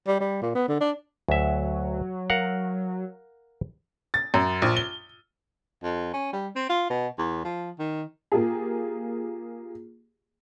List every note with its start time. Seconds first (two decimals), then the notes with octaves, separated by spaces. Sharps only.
0.07 G3
0.21 G3
0.42 A#2
0.55 B3
0.69 D3
0.80 D4
1.29 D2 F#3 E5
2.30 A#4 F5 F#5
4.14 A6
4.34 F#2
4.62 A#1
4.77 G7
5.83 F2
6.14 C#4
6.33 G3
6.56 C4
6.69 F4
6.90 B2
7.18 E2
7.44 F3
7.79 D#3
8.32 A#3 F4 G4 G#4